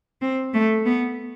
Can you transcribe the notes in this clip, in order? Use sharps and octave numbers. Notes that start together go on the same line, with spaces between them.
C4
A3
B3